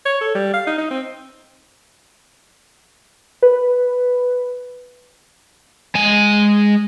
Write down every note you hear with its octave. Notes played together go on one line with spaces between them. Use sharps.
C#5
A4
G3
F5
D#4
D#4
C4
B4
G#3 G#5